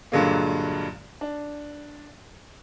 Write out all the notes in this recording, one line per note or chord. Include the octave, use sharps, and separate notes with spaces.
G2 A#2 D3 F#3 G#3 A#3
D4